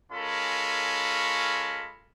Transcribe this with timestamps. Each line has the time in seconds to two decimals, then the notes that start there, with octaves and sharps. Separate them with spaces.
0.11 G#3 C#4 F4 A4 A#4 B5